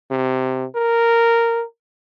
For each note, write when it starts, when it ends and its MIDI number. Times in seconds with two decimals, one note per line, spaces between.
0.11 0.65 48
0.76 1.64 70